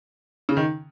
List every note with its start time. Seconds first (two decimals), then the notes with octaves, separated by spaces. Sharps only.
0.49 C#3
0.57 D#3